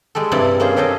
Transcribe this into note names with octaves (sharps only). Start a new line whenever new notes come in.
G3 G#3 G4 A4
G2 C3 C4 E4 D5 A5
A#3 C4 C#4 G#4 C5
C#4 G4 A4 C5 D#5